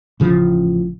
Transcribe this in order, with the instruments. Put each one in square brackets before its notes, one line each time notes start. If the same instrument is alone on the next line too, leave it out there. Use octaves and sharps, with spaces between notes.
[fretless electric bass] A1 C#3 F3